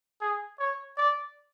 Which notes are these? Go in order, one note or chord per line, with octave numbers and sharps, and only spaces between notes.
G#4
C#5
D5